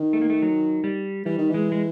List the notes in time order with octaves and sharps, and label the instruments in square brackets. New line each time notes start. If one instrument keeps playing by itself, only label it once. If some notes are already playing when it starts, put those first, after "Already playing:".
Already playing: [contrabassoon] D#3
[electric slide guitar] A3
A#3
A3
F#3
G3
[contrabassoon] E3 [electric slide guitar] G3
[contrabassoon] D#3
[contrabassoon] E3 [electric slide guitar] G#3
[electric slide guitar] G#3